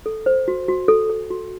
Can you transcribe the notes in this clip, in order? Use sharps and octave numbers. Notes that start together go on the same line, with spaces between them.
A4
C5
F#4
F#4
A4
A4
F#4